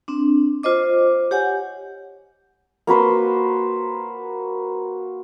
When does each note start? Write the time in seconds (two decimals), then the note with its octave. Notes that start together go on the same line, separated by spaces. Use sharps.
0.08 C4 D4
0.63 F4 C5 D#5 D6
1.31 G4 C#5 F#5 G#5
2.87 A#3 F#4 B4 C5